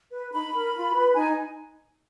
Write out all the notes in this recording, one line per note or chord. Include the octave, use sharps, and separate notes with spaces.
B4
D#4 B5
A#4
F4
B4
D#4 G#5